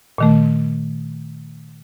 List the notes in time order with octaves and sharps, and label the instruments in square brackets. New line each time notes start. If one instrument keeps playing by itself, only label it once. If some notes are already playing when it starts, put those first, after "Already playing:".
[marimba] A#2 D#3 A3